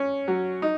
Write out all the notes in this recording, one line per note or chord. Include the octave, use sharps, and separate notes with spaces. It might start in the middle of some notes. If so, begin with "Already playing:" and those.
Already playing: C#4
F#3
D#4